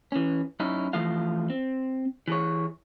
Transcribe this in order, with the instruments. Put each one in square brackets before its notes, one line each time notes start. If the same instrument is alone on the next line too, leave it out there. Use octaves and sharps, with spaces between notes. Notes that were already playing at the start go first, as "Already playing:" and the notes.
[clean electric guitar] E3 C#4
F#2 C#4 D#4 E4
E3 F3 A3 F4 F5
C4
E3 G#4 C#5